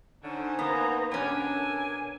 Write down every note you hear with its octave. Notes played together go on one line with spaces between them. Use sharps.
D3 C#4 D#4 C5
A#3 B3 F#5 G#5 A#5
B2 C#4 D4 G4 A#4 F#5 G#5 A5
A4